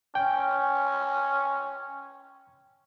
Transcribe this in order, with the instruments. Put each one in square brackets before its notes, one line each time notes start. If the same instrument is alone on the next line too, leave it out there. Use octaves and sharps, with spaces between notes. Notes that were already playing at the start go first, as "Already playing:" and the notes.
[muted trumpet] C#4 [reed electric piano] G5